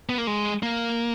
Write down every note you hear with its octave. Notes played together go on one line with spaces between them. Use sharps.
B3
A#3
G#3
A#3